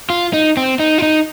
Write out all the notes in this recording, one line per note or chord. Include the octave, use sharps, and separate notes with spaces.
F4
D#4
C4
D#4
F4
D#4